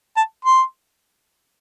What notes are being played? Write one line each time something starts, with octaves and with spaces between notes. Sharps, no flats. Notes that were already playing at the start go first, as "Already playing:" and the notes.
A5
C6